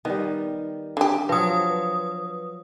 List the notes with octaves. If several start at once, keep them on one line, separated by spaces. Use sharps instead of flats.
D#3 G3 B3
D3 G4
F3 F#3 B4 D#6